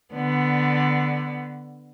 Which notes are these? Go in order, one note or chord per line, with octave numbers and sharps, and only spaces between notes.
D3 B3